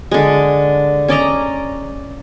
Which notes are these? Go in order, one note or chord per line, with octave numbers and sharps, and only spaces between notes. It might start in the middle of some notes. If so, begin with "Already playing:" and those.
D3 G#3
C#4 D5 D#5 A#5